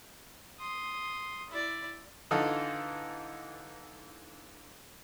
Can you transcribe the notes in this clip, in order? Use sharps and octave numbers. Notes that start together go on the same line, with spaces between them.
C6 D#6
E4 D5
D3 E3 D#4 F4 A4